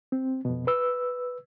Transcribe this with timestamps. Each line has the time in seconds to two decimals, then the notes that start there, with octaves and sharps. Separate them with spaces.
0.12 C4
0.45 F2 B2
0.67 B4 E6